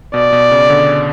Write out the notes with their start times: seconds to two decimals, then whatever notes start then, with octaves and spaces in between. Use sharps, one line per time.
0.14 B2 D5
0.32 B2
0.51 C#3
0.70 D3